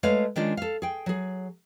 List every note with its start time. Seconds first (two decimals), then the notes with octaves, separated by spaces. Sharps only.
0.03 G#3 A3 B4 C#5 F5
0.36 D#3 G#3 C#4 D4 F4
0.57 A4 F5
0.82 G#4 G5
1.06 F#3 G#4